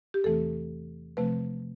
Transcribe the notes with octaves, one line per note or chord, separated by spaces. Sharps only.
G4
E2 C3 E3 A3 C4 A4
C3 F3 A3 C4 B4